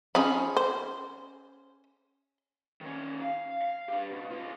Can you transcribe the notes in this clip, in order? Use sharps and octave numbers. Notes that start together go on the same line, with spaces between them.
F3 C#4 D#4 G#4 B5
C5
D#3 C#4
F5
F5
D4 G4
B2
D2 F4